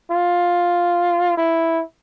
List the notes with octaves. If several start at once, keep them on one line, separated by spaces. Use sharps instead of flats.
F4
E4